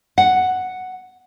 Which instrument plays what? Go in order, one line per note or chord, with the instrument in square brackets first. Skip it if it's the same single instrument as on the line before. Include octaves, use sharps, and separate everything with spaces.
[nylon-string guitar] F#5